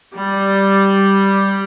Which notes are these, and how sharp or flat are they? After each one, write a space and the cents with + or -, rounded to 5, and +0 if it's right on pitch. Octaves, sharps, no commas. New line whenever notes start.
G3 +0